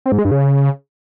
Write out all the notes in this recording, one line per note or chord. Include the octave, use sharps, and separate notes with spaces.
C4
G#2
G#3
G2
C#3